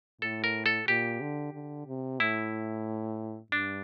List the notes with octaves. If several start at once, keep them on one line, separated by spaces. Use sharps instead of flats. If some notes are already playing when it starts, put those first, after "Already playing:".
A2 A4
A#4
A4
A#2 G4
D3
D3
C3
A2 E4
G2 D4